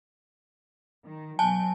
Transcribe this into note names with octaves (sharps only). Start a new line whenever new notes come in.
D#3
B2 F#3 G#5 A5